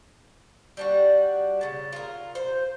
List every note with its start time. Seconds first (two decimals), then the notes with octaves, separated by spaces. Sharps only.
0.77 G3 D4 F#4
1.61 C#3 A5
1.93 F4 A#4
2.35 C5